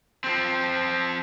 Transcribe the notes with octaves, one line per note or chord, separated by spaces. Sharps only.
F3 C4